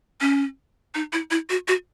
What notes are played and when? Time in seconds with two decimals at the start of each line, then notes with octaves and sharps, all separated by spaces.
0.21 C#4
0.95 D#4
1.13 E4
1.31 E4
1.50 F#4
1.68 F#4